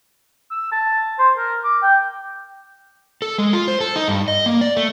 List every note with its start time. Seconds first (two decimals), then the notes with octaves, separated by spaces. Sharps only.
0.51 E6
0.72 A5
1.19 C5
1.37 A#4
1.64 D6
1.82 G5
3.22 A4
3.38 G#3
3.53 F4
3.68 C5
3.81 A4
3.96 D#4
4.08 G2
4.28 D#5
4.46 A#3
4.61 D5
4.77 A3